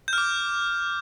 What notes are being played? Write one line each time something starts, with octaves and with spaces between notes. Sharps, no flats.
D6 F6 G6